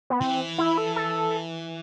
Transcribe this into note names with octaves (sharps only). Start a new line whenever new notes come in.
B3
E3 C4
E4
A4
A4